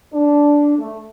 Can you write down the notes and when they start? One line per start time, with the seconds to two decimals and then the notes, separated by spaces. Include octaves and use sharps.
0.13 D4
0.78 A3